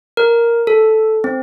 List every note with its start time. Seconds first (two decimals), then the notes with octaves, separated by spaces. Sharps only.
0.17 A#4
0.67 A4
1.24 C4